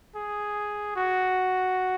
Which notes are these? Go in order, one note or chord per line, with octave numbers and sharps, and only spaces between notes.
G#4
F#4